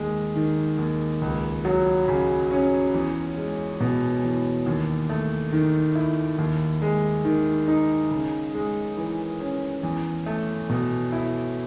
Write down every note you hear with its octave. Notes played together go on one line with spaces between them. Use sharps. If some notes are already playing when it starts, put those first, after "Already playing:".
Already playing: D#2 G#3
D#3
D#2
C#2
F#3
C#3
C#4
E2
G#3
B2
E2
D#2
A3
D#3
E4
D#2
G#3
D#3
D#4
C#3
G#3
E3
C#4
E2
A3
B2
E4